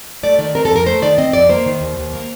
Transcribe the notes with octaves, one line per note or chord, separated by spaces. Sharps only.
A3 D5
D#3 D5
C4 A#4
A4
F2
A#4
A3 C5
D#3 D5
C4 D#5
F2 D5
A#3 C5
D#3
D#2
D#2
A#3